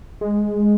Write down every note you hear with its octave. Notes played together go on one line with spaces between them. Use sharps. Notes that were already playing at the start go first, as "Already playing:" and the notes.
G#3